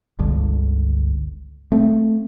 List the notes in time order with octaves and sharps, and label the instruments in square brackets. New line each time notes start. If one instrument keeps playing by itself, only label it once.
[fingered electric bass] G1 C#2 D3
A3 C4